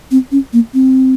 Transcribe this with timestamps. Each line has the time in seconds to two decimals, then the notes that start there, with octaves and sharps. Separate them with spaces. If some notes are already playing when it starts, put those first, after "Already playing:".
0.11 C4
0.32 C#4
0.53 A#3
0.74 C4